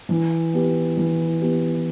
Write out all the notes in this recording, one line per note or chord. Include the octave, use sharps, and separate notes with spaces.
E3
B3 G4
E3
B3 G4